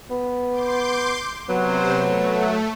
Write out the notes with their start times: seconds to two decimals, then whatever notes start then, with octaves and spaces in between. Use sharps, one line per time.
0.10 B3
0.51 C6 D6 G6
1.49 C3 F#3 B3 C5
2.01 A3